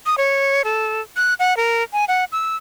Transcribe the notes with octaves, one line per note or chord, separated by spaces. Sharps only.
D#6
C#5
A4
F#6
F#5
A#4
G#5
F#5
E6